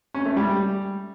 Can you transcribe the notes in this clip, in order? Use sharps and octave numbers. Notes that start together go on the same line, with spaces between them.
C#4
A3
G3